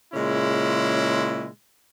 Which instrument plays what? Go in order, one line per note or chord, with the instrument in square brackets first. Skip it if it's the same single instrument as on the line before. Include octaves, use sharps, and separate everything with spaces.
[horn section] A#2 C#3 G#3 C#4 E4